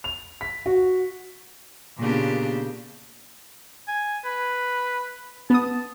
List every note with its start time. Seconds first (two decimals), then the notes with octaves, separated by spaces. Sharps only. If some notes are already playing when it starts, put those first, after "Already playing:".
0.04 F7
0.41 B6
0.66 F#4
1.98 A#2 C#3 A#3 B3 D4 G4
3.88 G#5
4.25 B4
5.50 B3 A5 D#6